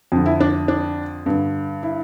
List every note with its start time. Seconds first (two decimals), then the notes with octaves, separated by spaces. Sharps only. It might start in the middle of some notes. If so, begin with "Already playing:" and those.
0.12 F2 D3
0.26 E4
0.40 D4
0.68 D4
1.26 G2 D3
1.83 E4